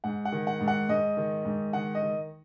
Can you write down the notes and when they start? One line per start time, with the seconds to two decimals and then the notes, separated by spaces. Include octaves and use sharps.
0.04 G#2 F#5
0.25 F#5
0.32 D#3
0.47 F#5
0.61 G#2
0.68 F#5
0.89 G#2 D#5
1.17 D#3
1.45 G#2
1.73 D#3 F#5
1.95 D#5
2.02 D#3